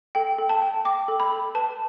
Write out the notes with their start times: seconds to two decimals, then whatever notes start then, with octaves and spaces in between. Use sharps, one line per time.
0.15 A4 G5
0.38 A4
0.49 A5
0.62 G5
0.85 G5 D6
1.08 A4
1.20 B5
1.32 A4
1.55 B4 A5